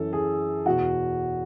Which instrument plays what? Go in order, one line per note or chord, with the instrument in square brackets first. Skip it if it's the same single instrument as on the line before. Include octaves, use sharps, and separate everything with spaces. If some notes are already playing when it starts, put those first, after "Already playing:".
Already playing: [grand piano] F#2 E3 A4
G#4
E2 B2 F#4